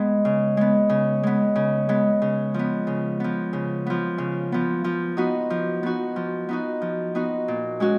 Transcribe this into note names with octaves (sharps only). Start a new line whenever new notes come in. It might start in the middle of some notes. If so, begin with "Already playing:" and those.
Already playing: G#3 B3
C#3
G#3 B3
C#3
G#3 B3
C#3
G#3 B3
C#3
F3 B3
C#3
F3 B3
C#3
F3 B3
C#3
F3 B3
F3
B3 D#4 F#4
F3
B3 D#4 F#4
F3
B3 D#4 F#4
F3
B3 D#4 F#4
A#2
G#3 C#4 F#4